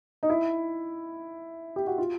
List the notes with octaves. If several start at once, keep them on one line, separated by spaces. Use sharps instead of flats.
D#4
E4
G4
F#4
F4